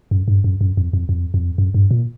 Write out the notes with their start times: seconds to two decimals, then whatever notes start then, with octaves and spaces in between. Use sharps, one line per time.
0.11 F#2
0.28 G2
0.44 F#2
0.61 F#2
0.77 F2
0.93 F2
1.09 F2
1.34 F2
1.58 F#2
1.74 G2
1.91 A#2